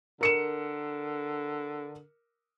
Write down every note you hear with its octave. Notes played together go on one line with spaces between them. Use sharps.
D3 A#4 C#7 E7